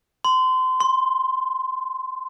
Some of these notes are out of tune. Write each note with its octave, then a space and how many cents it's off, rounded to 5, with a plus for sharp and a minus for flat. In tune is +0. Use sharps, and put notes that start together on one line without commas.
C6 -30
C6 +10